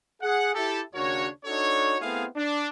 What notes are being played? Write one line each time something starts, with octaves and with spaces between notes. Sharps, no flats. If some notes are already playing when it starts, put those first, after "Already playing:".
G#4 F#5
E4 G4 A4
D#2 C#3 D4 F#4 A#4 C#5
D4 D#4 F#4 A4 C#5
A3 B3 C4 E4 G#4 F5
D4